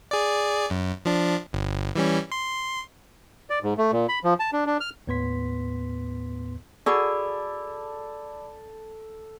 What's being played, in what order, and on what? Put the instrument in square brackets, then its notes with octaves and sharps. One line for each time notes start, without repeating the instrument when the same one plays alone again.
[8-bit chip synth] G#4 D5
F#2
F3 D4
G1
E3 G3 C#4
C6
[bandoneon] D5
G#2
A3
A#2
B5
F3
A5
D4
D4
F6
[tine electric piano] D#2 A2 B3 B4 C6 B6
[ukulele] F#4 G#4 [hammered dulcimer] A4 [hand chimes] D5 B5 D6